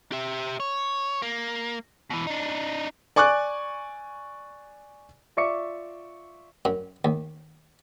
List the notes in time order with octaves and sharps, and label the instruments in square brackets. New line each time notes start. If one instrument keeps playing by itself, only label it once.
[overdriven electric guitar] G4 E5
C#5
A#3
B2 E3
D4 D#4
[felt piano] D5 G#5 C#6 D6 F#6
[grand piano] F4 D5 E5 C#6 D6 C#7
[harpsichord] F#2
D#2